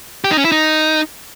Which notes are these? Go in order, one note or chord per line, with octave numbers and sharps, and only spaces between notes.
G4
D#4
C#4
E4
D#4